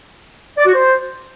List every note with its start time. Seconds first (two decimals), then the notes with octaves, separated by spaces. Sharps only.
0.58 D5
0.66 F#4
0.74 C5